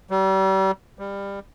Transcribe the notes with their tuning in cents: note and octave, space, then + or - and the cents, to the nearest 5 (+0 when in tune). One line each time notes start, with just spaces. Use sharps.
G3 -35
G3 +20